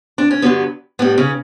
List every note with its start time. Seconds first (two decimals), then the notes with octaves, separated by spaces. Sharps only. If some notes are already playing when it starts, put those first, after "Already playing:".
0.18 D4
0.31 C#4
0.42 G2 D3 F#3 B3
0.99 A2 G3 B3
1.18 C#3 C#4